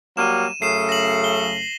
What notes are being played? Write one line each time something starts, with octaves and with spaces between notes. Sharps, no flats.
F#3 G3 A#3 D#7 E7
F#2 C#3 A3 C7 D#7 E7
A#6 F#7
G7